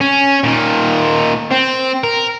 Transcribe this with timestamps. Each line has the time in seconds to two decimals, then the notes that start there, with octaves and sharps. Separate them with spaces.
0.01 C#4
0.44 A#2 D#3
1.51 C4
2.04 A#4